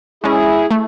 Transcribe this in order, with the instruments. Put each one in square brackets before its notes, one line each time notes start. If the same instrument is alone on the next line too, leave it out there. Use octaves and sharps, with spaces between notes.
[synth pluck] G#3 C#4 [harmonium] E4 G#4
[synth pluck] A3